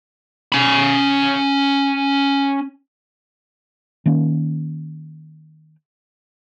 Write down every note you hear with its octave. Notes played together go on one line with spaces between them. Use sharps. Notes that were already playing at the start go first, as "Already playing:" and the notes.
C#4 B5
D#3 A#3 C#4